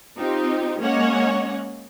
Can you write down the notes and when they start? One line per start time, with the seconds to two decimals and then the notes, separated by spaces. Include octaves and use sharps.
0.18 C4 D#4 F4 G4
0.81 G#3 A#3 C#4 C#5 D#5 F#5